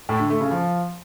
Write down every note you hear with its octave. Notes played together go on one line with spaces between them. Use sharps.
A2
D3
A3
C#3
F3